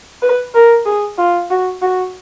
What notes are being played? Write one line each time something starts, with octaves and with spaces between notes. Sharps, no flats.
B4
A#4
G#4
F4
F#4
F#4